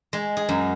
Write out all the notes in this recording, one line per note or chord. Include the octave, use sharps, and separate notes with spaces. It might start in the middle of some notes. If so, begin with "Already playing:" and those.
G#3
G#4
F#2